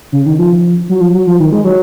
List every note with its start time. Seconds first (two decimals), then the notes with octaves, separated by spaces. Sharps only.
0.12 C#3
0.26 D#3
0.39 F3
0.89 F#3
1.01 F3
1.14 F#3
1.27 F3
1.40 D#3
1.52 G#3
1.64 F#3